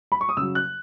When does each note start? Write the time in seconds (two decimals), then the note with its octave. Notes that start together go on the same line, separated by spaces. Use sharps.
0.12 B5
0.21 C#6
0.29 D#6
0.37 C#3 E6
0.41 F#3
0.55 F#6